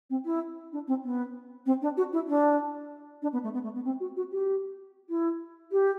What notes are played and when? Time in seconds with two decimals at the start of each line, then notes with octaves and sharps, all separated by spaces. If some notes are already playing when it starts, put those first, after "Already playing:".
0.10 C4
0.25 E4
0.72 D4
0.87 C4
1.03 B3
1.66 C4
1.82 D4
1.97 F#4
2.13 E4
2.28 D4
3.22 D4
3.33 B3
3.43 A3
3.53 B3
3.63 A3
3.74 B3
3.85 C4
4.00 F#4
4.16 F#4
4.32 G4
5.09 E4
5.72 G4